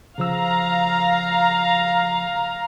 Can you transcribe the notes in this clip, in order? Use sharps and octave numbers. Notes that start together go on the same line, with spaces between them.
C#3 F3 F5 A#5 E6